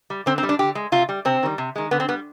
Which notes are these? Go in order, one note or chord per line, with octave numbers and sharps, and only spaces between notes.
G3
D3 C4
C4
G3
D4
D3 G4
G#3
C3 F4
G3
C3 C4
D#3 G3
C3
D#3 G#3
D3 B3
C4
G3 B3